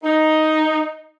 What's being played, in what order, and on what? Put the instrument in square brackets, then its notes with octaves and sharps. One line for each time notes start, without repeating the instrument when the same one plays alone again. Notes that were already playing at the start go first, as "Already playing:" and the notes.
[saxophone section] D#4